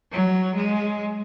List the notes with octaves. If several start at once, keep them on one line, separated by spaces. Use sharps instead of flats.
F#3
G#3